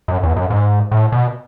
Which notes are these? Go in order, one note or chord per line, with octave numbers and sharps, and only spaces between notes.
F#2
E2
F#2
G#2
A2
B2